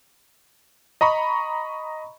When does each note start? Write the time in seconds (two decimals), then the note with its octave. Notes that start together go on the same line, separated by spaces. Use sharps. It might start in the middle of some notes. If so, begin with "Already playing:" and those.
1.01 D#5 A#5 B5 C#6